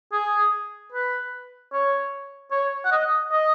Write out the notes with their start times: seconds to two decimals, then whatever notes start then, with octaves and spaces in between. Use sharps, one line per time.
0.13 G#4
0.93 B4
1.73 C#5
2.51 C#5
2.85 F#5
2.92 D#5
3.32 D#5